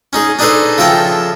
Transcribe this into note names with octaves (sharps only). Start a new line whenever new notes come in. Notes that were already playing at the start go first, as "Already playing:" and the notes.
C#4 D#4 G#4
D4 D#4 G#4 A4 B4 C5
C#3 F3 A4 E5 G5 A#5